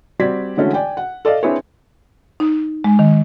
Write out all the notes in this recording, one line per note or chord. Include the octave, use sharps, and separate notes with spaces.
G3 C4 F#4 D5 G#6 B6
D3 E3 G#3 A3 C#4 F#4
D5 G5 G#5
F#5
A4 D5 D#5 F5
C4 D4 E4 G#4 B4 C#5
D#4
G#3
D#3